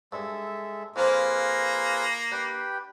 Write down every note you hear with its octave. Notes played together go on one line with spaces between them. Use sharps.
G2 G#3 A4 E5
F2 F3 A#3 F4 G#4 B4 A#5
D4 G4 B4 G5